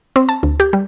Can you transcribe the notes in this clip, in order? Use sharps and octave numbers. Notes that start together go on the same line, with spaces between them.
C4
A5
D2
G4
G3